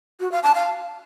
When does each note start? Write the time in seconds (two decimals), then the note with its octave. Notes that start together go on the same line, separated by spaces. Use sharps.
0.20 F#4
0.32 F5
0.43 A5
0.55 F5